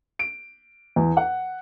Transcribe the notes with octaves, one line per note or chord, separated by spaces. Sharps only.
D7
E2
F#5